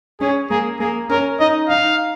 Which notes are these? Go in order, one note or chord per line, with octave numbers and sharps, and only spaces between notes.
C#4 G#4
A#3 G#4
A#3 G#4
C#4 A#4
D#4 D#5
D#4 F5